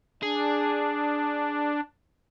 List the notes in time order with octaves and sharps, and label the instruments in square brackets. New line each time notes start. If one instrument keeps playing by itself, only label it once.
[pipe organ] D4 [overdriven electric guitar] G#4